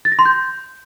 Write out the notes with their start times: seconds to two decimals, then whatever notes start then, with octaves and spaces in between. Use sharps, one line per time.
0.05 A6
0.12 A#6
0.19 C6
0.25 G6